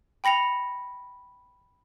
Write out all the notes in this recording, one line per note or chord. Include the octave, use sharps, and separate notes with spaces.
G5 B5 A#6 C#7 F7